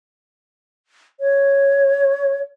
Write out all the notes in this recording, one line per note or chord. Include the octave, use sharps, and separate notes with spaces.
C#5